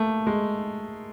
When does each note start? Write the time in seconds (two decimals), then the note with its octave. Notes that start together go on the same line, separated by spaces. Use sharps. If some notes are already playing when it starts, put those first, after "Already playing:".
Already playing: A3 A#3
0.27 G#3